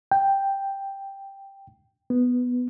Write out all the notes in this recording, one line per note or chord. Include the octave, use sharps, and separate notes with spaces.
G5
B3